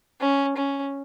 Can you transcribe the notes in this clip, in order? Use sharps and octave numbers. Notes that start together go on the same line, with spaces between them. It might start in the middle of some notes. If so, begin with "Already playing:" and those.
C#4
C#4